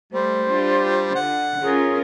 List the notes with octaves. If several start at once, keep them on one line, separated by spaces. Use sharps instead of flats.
G3 A3 C5
D4 F4 G4
D3 F#5
C#4 F4 G#4 A#4